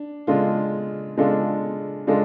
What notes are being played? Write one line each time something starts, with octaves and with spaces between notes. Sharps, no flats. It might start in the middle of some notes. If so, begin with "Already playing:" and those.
Already playing: D4
C#3 G#3 D4 F4 A4
C#3 G#3 D4 F4 A4
C#3 G#3 D4 F4 A4